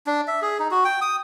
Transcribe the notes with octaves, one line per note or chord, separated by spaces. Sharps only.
D4
E5
G#4
D#4
F#4
G5
D#6